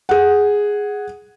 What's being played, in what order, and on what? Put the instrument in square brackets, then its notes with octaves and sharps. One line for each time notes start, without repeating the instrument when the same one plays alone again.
[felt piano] G#4 F#5